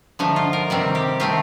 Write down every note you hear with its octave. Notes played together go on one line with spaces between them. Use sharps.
D3 F3 A3 D#4
F4
A#4
C3 D#3 G3 C4
G4
D#3 A3 C4 F4